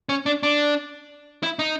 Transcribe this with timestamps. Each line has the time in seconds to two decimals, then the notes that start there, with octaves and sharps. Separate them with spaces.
0.09 C#4
0.26 D4
0.43 D4
1.43 E4
1.59 D#4